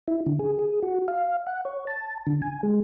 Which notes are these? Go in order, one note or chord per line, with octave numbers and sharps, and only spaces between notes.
E4
D3
G#4
G#4
F#4
F5
F#5
C#5
A5
D3
G#5
G#3